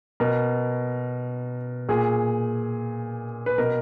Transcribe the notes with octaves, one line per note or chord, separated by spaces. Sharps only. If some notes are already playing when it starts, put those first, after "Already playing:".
B2 A#4
A#2 G#4
B4
B2 A#4